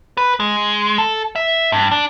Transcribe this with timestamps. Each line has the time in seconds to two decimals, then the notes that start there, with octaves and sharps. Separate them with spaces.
0.17 B4
0.40 G#3
0.98 A4
1.36 E5
1.72 G2
1.91 D4